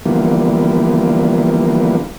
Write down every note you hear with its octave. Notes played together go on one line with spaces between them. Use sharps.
D3 E3 F3 G3 A#3 B3